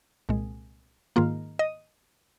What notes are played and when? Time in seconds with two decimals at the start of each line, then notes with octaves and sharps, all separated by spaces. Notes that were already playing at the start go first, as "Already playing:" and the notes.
0.29 C2 A#2 G#3
1.16 G#2 D#3 A#3 F4
1.59 D#5